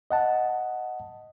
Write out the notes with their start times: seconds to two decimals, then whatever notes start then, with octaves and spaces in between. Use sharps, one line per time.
0.11 D#5 F#5 A5